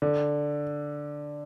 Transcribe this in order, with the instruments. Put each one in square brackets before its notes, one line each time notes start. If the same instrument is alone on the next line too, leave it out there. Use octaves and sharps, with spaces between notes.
[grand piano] D3